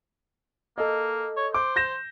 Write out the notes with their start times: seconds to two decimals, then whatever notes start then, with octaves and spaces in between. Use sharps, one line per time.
0.78 A#3 A4 D#5
1.36 C#5
1.54 C5 D6
1.76 G6 A#6 E7